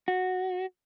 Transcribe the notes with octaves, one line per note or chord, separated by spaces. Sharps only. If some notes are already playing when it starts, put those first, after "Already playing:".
F#4